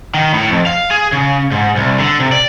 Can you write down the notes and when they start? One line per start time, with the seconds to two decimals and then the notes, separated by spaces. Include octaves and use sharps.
0.14 D#3
0.34 A2
0.50 F2
0.66 F5
0.91 G#4
1.12 C#3
1.52 G#2
1.76 C2
1.99 D3
2.20 C3
2.32 D5